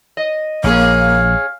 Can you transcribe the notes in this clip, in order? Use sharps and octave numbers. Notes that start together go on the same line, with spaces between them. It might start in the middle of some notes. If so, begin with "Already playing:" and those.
D#5
A#1 A#3 C#4 G#4 F5